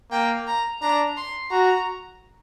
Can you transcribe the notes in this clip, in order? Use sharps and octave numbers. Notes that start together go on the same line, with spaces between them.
A#3 G5
A#5
D4 A#5
C6
F#4 A#5